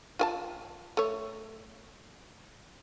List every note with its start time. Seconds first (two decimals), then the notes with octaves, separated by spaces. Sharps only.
0.19 F4 G#5 A5
0.97 A3 C#5